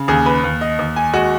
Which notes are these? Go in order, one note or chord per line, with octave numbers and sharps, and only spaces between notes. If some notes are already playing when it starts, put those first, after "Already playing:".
Already playing: C#3
D#2 G#4
B4
D#2
D#5
D#2
G#5
G#3 F#4